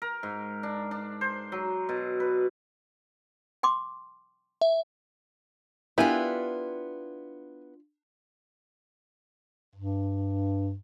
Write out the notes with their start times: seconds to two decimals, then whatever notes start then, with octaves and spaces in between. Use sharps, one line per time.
0.02 A#4
0.23 G#2
0.63 D4
0.91 D4
1.21 C5
1.52 F#3
1.89 B2
2.20 B4
3.63 G5 C6 D6
4.61 E5
5.98 B3 D4 E4 F4 G4 A#4 G#5
9.75 G2